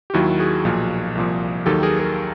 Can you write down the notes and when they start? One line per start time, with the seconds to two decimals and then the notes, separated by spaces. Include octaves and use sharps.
0.10 G4
0.14 D#2 D#3 F#3 E4 F#4
0.39 F#4 G#4
0.65 B1 A#2 F3
1.15 C2 A#2 F3
1.66 D#2 D#3 F#3 G4 A4
1.83 G#4 A#4
1.99 G#4 A#4